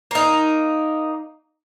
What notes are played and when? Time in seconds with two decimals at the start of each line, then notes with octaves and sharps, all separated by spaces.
0.11 A#3 D#4